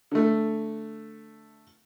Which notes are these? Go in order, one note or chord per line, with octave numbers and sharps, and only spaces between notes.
D3 A3